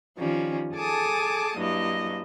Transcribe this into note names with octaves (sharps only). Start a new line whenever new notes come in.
D#3 F3 G3 C#4
G#4 A4 G#5 A5 D6 D#6
G2 F#3 A#3 E4 D#5